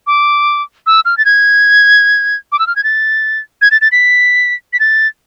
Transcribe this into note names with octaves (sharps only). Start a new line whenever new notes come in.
D6
E6
F6
A6
G#6
D6
E6
F6
G#6
A6
G#6
A6
A6
B6
B6
A6